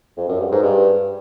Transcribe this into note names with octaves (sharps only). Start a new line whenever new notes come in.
F2
F#2
G2
G#2
G2